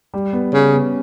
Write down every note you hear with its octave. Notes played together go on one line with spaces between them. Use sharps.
G3
B3
C#3 C#4
B3